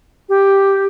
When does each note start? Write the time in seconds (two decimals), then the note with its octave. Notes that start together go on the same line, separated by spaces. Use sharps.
0.29 G4